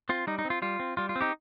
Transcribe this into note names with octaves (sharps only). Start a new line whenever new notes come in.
C4 F4
G3 D#4
D#4
C4
F4
G3 F4
C4
G3 F4
F4
C4
D#4 G4